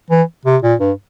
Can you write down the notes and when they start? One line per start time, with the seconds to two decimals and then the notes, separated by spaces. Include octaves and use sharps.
0.10 E3
0.45 C3
0.62 A#2
0.80 G2